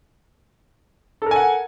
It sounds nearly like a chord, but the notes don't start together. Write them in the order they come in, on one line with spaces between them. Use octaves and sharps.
A4 A#4 G#5 F#5